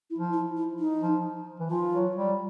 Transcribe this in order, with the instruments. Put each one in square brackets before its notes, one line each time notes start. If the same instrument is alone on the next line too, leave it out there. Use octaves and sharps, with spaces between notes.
[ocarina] E4
[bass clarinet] F3
[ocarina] E4
E4
D#4
[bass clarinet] F3
E3
[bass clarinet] F3 [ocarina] F4
[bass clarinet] F#3
G3